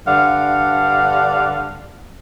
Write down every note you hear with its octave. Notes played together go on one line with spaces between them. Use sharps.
G2 D3 D5 F5 F#5